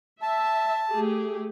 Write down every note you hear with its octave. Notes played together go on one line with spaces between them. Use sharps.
E5 A5
A3 G4 G#4